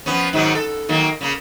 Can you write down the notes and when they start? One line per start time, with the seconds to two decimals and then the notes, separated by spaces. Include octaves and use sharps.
0.06 F3 B3 C#4
0.33 G#2 D#3 F#3
0.55 A4
0.89 D#3 F#3 A#3
1.21 C#3 A#3